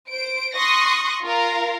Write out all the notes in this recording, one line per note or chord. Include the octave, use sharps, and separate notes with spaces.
C5 D7
C6 C#6 D#6 F#6 A#6
F4 A#4 F5